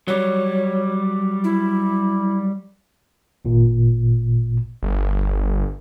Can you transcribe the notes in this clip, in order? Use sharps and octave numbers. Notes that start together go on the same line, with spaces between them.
F#3 G3 C#5
E4
G#1 A#2
G1